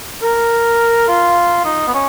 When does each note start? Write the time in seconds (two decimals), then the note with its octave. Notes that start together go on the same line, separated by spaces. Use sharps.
0.23 A#4
1.08 F4
1.65 D#4
1.87 B3
1.94 C#4